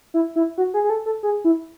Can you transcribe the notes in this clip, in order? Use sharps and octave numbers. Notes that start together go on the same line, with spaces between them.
E4
E4
F#4
G#4
G#4
A4
A4
G#4
E4